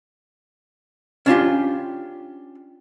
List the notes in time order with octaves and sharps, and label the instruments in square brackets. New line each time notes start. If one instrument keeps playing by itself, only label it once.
[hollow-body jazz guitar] C#4 D4 F4 G4